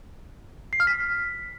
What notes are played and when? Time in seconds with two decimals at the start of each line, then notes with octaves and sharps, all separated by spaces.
0.73 C7
0.80 F6
0.87 B6